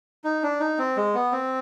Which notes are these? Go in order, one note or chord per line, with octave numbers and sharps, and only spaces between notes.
D#4
D4
D#4
C4
G#3
B3
C4